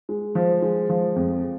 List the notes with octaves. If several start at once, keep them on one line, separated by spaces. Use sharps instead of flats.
G#3
F3
G#3
F3
F2